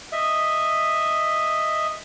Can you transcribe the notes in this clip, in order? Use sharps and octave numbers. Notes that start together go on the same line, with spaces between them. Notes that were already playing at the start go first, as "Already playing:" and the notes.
D#5 E5